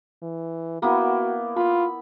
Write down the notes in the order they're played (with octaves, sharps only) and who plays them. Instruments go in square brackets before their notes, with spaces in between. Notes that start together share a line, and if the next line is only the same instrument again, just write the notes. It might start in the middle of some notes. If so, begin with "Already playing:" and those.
[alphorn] E3
[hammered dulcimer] A#3 B3 E4 [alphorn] F#4
[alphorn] F4 [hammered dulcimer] B5